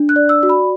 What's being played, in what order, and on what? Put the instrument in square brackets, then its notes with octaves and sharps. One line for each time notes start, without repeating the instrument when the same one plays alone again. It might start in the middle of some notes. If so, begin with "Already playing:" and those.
Already playing: [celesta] D4
F#6
D5
E6
F#4
B5